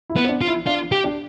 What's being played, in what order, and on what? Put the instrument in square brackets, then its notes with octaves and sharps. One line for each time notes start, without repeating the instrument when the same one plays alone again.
[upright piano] E4
[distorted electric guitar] B3
[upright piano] C4
D4
[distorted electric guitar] F4
[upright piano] E4
[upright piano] D4 [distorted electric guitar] F4
[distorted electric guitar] G4
[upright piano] D4